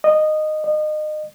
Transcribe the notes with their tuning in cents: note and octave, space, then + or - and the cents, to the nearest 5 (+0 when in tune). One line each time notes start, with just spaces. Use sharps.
D#5 -15
D#5 -30